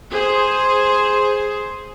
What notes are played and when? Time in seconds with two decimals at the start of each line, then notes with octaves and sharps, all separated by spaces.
0.12 G#4 C5